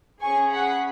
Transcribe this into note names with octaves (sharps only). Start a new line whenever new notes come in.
C#4 G#4 G#5 C#6
F#5 B5